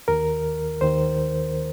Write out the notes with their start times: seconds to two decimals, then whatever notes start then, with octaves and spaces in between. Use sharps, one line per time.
0.08 D#2 D#3 A#4
0.81 D#2 D#3 C5